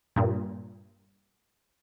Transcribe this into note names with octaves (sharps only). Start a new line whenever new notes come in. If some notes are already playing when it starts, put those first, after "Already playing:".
G2 A#2